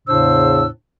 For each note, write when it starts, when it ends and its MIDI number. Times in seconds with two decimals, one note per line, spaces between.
0.08 0.67 40
0.08 0.67 45
0.08 0.67 49
0.08 0.67 62
0.08 0.67 72
0.08 0.67 88